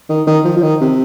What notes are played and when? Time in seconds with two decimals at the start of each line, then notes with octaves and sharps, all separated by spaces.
0.09 D#3
0.27 D#3
0.45 F3
0.57 F3
0.62 D#3
0.81 C3